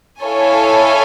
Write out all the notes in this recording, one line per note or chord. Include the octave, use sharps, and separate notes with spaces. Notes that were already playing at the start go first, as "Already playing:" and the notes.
E4 A4 C#5 F5 G#5